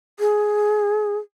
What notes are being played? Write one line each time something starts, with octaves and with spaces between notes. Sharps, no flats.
G#4